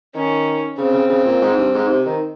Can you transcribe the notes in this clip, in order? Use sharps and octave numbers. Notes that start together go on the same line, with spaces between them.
D#3 C#4
C#3 C4
C#3
C#3
A#2
G#2
G2
G#2
C3
D#3